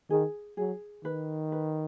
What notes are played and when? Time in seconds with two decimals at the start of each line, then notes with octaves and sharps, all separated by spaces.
0.10 D#3 G#4
0.57 F#3 G#4
1.04 D#3 B4
1.52 B4